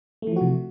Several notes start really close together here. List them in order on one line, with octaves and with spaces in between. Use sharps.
A3 E3 F3 F#4 C3